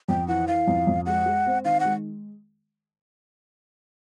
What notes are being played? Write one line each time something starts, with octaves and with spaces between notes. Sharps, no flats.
F2 G5
E3 F#5
E3 F5
F2
F2
G#3 F#5
G#3
C4
D#3 F5
G#3 F#5